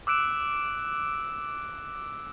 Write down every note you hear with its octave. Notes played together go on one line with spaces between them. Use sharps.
D6 E6 F#6 D7 E7